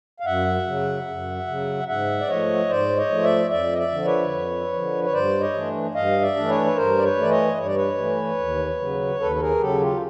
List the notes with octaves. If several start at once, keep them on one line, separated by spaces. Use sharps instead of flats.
F5
F#2 E5 F#5
C#3 F#3
F#2
C#3 F#3
G#2 E5 F#5
D5
F3 A3 C#5 D#5
G#2 C5 D5
C#5 D#5
F3 A3
D5 E5
F2 D5 E5
D#5
D5 E5
D3 F3
B4 C#5
F2
D3 F3
C#5
G2 C5 D5
C#5 D#5
E3 A3 D4
G2 D#5 F5
D5 E5
E3 A3 D4
B4 C#5
B4
G2 A#4 C5
D5
B4 C#5
E3 A3 D5
C#5 D#5
G2 C#5
D5
B4 C#5
E3 A3
D#2
C#3 F#3
D#2 A4 B4
A4
G#4 A#4
C#3 F#3 G4 A4
F4 G4